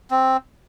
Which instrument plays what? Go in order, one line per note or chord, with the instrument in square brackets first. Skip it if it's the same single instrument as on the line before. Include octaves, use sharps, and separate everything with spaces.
[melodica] C4